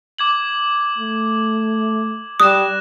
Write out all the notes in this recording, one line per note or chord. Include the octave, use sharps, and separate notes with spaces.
D6 G#6 F#7
A3
G3 D#6 F#6 A#6 E7